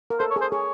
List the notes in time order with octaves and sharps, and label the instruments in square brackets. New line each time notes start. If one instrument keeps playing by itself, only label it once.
[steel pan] A#4
[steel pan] A4 [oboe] C5
[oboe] C#5
[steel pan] G#4
[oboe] C5
[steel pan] G#4 [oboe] C#5